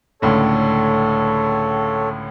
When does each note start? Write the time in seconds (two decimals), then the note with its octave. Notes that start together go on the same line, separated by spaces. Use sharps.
0.22 C#2 A2 D3 A4 C#5